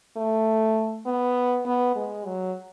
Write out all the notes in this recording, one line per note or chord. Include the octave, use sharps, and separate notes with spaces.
A3
B3
B3
G#3
F#3